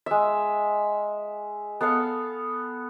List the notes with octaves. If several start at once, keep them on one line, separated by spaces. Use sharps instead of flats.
G#3 E5
B3 A4 F5 F#5